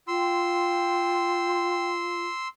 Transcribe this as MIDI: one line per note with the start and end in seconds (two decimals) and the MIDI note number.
0.08 2.25 65
0.08 1.89 79
0.08 2.48 84
0.08 2.48 88